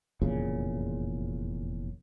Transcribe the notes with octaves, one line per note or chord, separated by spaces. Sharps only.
F1 E2 A#2 C#3